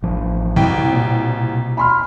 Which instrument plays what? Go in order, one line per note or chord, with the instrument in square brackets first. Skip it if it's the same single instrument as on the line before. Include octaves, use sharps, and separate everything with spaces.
[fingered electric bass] A1 F3
[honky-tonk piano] C2 G5 [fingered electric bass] B2
[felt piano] A#2
B5 C6 F6